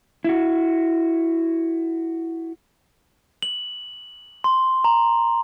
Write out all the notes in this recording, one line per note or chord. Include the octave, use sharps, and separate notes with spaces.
E4 F#4
F#7
C6
A#5